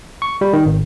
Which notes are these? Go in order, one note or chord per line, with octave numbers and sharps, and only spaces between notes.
C#6
G3
D#3
G#1